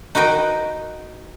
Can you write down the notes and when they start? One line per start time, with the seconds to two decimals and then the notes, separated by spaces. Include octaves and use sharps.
0.15 D#4 F#4 B4 D#5 G5